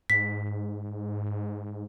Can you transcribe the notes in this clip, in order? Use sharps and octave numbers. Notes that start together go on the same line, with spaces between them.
G#2 B6